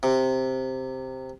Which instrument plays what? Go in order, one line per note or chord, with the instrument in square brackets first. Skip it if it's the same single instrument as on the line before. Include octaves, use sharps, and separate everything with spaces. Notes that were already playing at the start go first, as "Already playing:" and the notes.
[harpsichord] C3